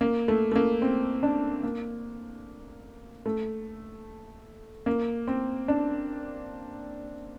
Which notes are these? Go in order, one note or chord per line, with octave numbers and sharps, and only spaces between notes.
A#3
A3
A3
A#3
C4
D4
A#3
A3
A#3
C4
D4